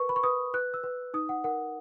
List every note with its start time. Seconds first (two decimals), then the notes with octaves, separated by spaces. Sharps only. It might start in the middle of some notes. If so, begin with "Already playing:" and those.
Already playing: A#4 B4 C#6
0.09 B5
0.16 C#6
0.23 B4 D#6
0.54 B4 F#6
0.74 E6
0.84 B4
1.14 D#4 D#6
1.29 F#5
1.44 A#4 F#5